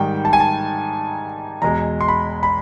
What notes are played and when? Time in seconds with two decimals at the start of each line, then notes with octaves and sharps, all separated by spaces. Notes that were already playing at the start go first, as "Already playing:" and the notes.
Already playing: G#2 D#3 G3 G5
0.25 A5
0.33 G#5
0.40 A5
1.62 E2 B2 G#3 A#5
2.01 C6
2.08 B5
2.43 B5